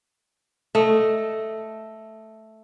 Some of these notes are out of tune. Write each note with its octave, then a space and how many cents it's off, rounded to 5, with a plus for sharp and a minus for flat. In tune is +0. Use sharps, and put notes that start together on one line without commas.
A3 +0 D#5 +0